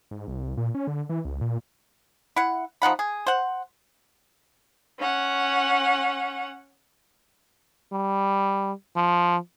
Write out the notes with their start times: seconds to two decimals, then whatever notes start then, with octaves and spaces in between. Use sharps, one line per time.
0.11 G#2
0.28 C2
0.57 A#2
0.75 C#4
0.87 D3
1.09 E3
1.25 C#2
1.41 A#2
2.36 E4 F#5
2.82 F3 D#4 F#5 B5
2.99 G#4
3.27 C5 F#5
4.99 C#4 F#5
7.93 G3
8.96 F3